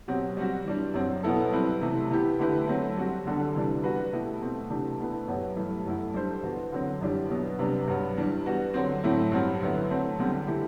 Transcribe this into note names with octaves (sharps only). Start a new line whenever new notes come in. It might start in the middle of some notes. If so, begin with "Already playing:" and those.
B2 F#3 C4 G4
G3 C4 F#4
E3 G3 D4
F#2 F#3 C4
B2 F#3 B3 E4 A4
G3 C4 E4 B4
C3 E3 A3 E4
E3 B3 E4 G4
D3 A3 E4 G4 B4
F#3 A3 C4 E4
G3 C4 F#4
E2 D3 G3 D4 A4
C3 E3 G3 D4
G3 B3 F#4 B4
B2 A3 E4 G4
B2 A3 C4
C3 E3 A3 D4 G4
B2 A3 E4 B4
F#2 F#3 B3 E4 G4
G2 E3 A3
F#2 F#3 A3 E4
G3 D4 A4 C5
E3 B3 F#4
D3 F#3 C4
F#2 E3 G3 D4 G4
B2 F#3 B3
C3 G3 B3 D4
G2 F#3 B3
E3 G3 D4
G3 B3 F#4
D3 F#3 C4
A2 F#3 A3 C4 E4
G2 F#3 C4
D3 F#3 B3 E4
F#3 A3 C4
E2 D3 G3 C4 G4
E3 A3 E4 G4